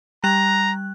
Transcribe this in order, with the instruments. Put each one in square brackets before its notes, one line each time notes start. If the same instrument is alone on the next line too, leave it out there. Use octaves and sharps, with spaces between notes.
[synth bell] G3 F#6 [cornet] A#5